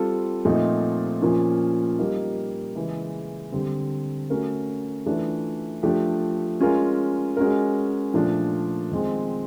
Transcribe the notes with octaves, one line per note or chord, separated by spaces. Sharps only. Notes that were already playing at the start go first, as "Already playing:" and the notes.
Already playing: G3 C4 F4 A4
A#2 F3 A3 C4 D#4
A#2 F3 A#3 C#4
G3 A#3 D#4
C#3 E3 G#3
D3 G3 C4
A3 C#4 F#4 A#4
E3 A3 D4 F4
F3 A3 D4 G4
G#3 C#4 F4 A#4
G#3 C#4 F#4 A#4
A#2 F3 A3 D4
D#3 G#3 C4